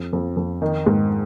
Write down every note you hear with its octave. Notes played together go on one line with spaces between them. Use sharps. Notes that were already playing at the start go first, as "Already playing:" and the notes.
Already playing: F2
F2
F2
D#3 D#4
G#2